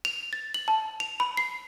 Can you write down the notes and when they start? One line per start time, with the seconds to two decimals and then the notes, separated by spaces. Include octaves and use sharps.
0.05 F7
0.33 A6
0.54 F#7
0.68 A5
1.00 F7
1.20 B5
1.37 C7